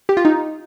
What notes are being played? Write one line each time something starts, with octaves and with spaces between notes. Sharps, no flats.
G4
F4
D#4